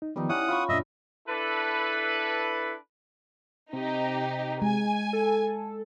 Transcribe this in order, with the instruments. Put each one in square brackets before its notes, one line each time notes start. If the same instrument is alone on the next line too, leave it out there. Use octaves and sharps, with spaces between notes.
[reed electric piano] D#4
[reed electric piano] D#3 F3 B3 [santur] G3 D#4
[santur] C#4 [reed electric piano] E4 [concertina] F#5 D#6
[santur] F4 B5 C#6
[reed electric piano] F#2 A#2 D4 [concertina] D#5 E5
[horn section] D4 E4 A4 B4
[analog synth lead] C3 [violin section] D#4 G4
[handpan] G#3 [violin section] G#5
[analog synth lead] A4